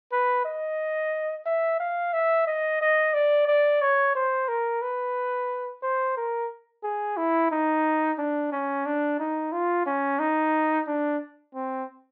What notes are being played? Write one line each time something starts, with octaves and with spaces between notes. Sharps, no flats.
B4
D#5
E5
F5
E5
D#5
D#5
D5
D5
C#5
C5
A#4
B4
C5
A#4
G#4
E4
D#4
D4
C#4
D4
D#4
F4
C#4
D#4
D4
C4